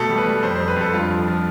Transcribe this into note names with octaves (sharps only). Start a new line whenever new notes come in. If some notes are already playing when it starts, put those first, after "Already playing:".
Already playing: B2 A3 A4
G3
B4
G3
F2 C5
F2 C5
B4
F2 A4
G2 F4
F3
F3